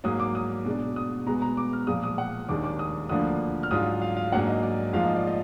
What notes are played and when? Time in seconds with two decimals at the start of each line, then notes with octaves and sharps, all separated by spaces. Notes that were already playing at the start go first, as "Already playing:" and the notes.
0.04 G#2 F#3 A#3 D#6
0.20 D6
0.35 D#6
0.66 B2 G#3 D4
0.96 D#6
1.26 B2 G#3 B3 A#5
1.42 A#5
1.57 D6
1.73 F6
1.87 A#2 F3 G#3 D#6
2.03 D#6
2.18 F#5
2.49 D#2 D#3 G#3 D4 D6
2.64 D6
2.79 D#6
3.09 D2 D3 F3 A#3 D4 D#6
3.63 F6
3.71 G#2 F#3 D4 F4 D#6
4.02 F5
4.17 F5
4.32 G#2 F#3 A#3 D4 F#5
4.47 D#5
4.63 D5
4.93 G#2 F3 A#3 F4 F5
5.05 D#5
5.16 D5
5.27 D#5